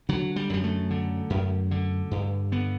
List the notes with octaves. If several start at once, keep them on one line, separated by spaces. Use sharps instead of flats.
D3 F#3
G3
F#2 G3
A3
D3
F#2
D3
G2
D3 B3